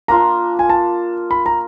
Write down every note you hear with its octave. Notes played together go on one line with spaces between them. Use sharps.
A#3 D4 F4 A#5
G#5
A5
B5
A#5